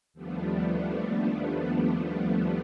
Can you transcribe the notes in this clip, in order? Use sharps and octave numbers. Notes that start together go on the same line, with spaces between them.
D#2 F3 G3 A3 B3 D4